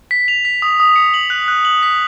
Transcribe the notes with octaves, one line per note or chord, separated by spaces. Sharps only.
B6
F7
B6
D#6
D#6
C#7
F#7
F#6
F#6
F#7
B6